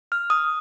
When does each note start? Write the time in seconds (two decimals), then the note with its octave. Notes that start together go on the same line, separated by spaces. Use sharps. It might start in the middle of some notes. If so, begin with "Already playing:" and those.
0.12 F6
0.30 D#6